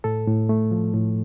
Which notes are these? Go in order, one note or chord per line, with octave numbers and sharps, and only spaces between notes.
A2 A4
A2
A3
F3
A2